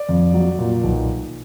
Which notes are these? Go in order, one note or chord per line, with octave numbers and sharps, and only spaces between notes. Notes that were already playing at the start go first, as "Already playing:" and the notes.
Already playing: D5
F2
F#3
A#2
B1